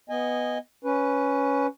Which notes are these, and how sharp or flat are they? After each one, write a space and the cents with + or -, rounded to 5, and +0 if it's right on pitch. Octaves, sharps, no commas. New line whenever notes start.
B3 +0 D#5 +0 G#5 -20
C#4 +10 B4 +0